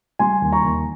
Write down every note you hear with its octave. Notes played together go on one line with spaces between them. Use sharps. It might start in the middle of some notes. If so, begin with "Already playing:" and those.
G3 G#5 C6
D#2
A#5 C#6
D#2